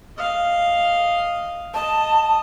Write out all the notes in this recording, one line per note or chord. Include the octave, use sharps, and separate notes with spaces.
D#5 F5
D#5 A5